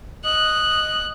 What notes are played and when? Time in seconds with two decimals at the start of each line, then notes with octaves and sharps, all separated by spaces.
0.25 D#5 F#6